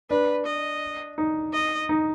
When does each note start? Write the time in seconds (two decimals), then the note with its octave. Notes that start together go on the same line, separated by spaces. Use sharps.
0.10 D4 B4
0.46 D#5
1.18 D#4
1.53 D#5
1.89 D#4